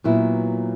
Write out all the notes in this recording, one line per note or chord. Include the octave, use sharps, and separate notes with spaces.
A#2 F#3 B3 E4